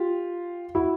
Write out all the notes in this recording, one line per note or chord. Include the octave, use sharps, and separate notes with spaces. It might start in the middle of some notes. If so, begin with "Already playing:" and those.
Already playing: F4 G4
E4 F#4